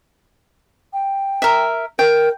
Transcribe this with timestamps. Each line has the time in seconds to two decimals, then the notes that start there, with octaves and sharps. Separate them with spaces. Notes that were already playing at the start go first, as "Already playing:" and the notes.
0.93 G5
1.42 A#4 E5
1.99 A#4 G5